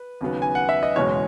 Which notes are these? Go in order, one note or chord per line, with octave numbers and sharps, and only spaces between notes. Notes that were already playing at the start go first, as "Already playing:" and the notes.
Already playing: B4
D#2 C#3 F#3 B3
G#5
F#5
E5
D#5
F#1 E2 B2 G#3 C#4 C#5